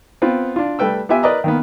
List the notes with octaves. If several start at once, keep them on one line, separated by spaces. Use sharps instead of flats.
B3 C4 F4
D4 F4
G3 A3 B4 G5 E6
B3 F4 G4 E5 G#5
A#4 B4 D5 D#5 A#5
D#3 A#3 B3